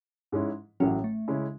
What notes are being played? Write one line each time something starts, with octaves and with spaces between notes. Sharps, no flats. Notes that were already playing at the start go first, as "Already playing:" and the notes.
G#2 G#3 C#4 E4
A1 A2 F#3 C#4
A3
C#3 G#3 C#4 E4